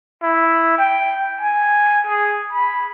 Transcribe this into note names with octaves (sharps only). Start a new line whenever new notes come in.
E4
G5
G#5
G#4
B5